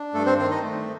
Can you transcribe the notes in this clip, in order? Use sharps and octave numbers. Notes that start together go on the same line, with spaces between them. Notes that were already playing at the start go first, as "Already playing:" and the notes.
Already playing: D4
G2 A3 A4
C4 C5
D#3 C4 C5
D#4 D#5
A3